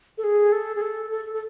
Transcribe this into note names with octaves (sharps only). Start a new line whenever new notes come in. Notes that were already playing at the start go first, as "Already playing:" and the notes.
A4
G#4
A4
G#4
A4
A4
A4